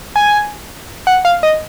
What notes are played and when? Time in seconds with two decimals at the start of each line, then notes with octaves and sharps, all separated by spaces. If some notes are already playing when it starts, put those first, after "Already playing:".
0.16 G#5
1.07 F#5
1.25 F5
1.43 D#5